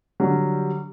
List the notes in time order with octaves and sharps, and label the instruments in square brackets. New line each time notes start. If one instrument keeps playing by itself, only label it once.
[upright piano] D3 F#3 G3